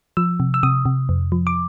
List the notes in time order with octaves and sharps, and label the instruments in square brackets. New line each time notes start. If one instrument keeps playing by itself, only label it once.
[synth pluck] F3 E6
C3
E6
C3 D#6
C3
F2
F3
D6